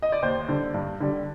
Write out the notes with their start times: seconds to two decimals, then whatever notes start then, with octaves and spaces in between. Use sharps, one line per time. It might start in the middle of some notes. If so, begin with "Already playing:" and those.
0.02 D#5
0.12 D5
0.22 D#2 C5
0.48 D3 G3
0.74 G2
1.00 D3 G3